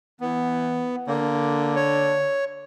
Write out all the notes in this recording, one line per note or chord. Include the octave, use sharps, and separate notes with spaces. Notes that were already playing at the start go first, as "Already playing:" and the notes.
E3 B3
D3 A#3
C#5